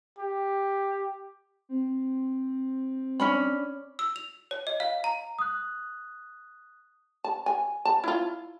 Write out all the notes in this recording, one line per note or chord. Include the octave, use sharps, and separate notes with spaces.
G4
C4
C#4 D4 B5
E6
F7
C#5
D#5
F5
A#5
D#6 F#6
A5
G#5
A5
E4 F4